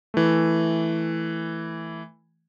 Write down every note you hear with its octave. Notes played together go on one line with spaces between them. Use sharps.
E3 A3